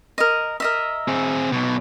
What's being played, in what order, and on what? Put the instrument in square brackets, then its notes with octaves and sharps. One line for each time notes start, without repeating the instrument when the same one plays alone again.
[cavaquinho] A#4 D#5
A#4 D#5 E5
[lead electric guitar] C4 G#4
B1 B2